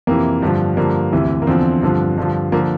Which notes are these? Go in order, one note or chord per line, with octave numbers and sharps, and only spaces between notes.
F2 C3 E3 A#3
G2 D3 F3
G2 D3 F3 A#3
D2 C3 E3
A#3
E2 D3 F3 C4
G2 D3 F3
G2 D3 F3
D3 F3 A#3